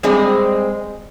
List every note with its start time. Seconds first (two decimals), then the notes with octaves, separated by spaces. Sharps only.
0.03 G3 G#3 C4 G#4 D#5